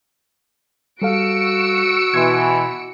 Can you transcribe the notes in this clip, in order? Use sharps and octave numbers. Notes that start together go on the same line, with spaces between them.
G3 F#4 A4 F5 E6 C#7 D7
B2 E3 C6 G#6